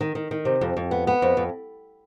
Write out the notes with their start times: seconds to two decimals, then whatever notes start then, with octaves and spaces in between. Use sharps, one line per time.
0.01 D#3
0.15 D#3
0.31 D#3
0.45 C3
0.61 F2
0.77 F2
0.91 B3
1.07 B3
1.22 F2
1.37 F2